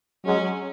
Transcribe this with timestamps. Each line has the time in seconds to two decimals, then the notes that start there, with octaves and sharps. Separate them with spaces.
0.24 F#3 G#3 C#4